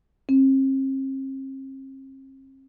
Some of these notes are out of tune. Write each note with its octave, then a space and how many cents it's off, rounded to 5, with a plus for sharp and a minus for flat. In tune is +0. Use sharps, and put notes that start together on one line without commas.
C4 +40